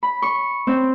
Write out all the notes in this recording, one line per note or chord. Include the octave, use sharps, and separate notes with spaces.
B5
C#6
C4